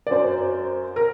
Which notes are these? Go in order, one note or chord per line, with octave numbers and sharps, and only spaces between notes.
D5
F#2 F#3 C5
A#4